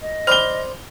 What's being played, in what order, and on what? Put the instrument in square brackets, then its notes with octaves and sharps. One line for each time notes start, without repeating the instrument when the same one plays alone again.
[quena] D#5
[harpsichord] C5 D5 [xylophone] B5 F6 [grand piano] F7 G7